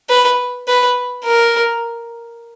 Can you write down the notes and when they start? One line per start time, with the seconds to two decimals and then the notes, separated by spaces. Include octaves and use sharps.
0.09 B4
0.68 B4
1.24 A#4